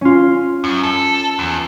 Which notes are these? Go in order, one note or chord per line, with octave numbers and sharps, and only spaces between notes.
C#4 F4
F#2
A4
E2